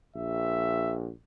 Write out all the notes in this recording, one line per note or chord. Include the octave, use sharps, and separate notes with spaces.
A#1 E5